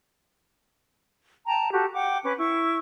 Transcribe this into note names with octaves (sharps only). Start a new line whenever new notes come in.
G5 A5 A#5
F#4 G4 A4
F#5 G5 D6
C#4 B4 D6
E4 C#6